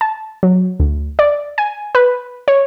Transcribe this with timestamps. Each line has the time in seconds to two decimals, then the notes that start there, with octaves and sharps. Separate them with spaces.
0.01 A5
0.43 F#3
0.80 D2
1.19 D5
1.58 G#5
1.95 B4
2.48 C#5